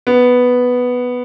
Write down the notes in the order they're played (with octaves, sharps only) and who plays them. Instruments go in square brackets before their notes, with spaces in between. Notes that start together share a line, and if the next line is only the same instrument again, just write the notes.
[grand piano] B3